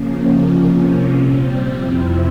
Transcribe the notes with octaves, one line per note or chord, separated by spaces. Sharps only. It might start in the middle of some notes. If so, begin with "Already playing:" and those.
Already playing: C#3 F3 A#3 C#4
C3 F3 A#3 C#4
A#2 G3 C4
F2 C3 F3 C4 E4